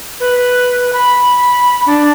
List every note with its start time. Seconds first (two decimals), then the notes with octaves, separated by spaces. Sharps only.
0.20 B4
0.93 B5
1.86 D4